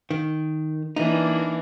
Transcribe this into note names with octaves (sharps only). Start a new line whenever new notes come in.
D#3
E3 A#3 D4 D#4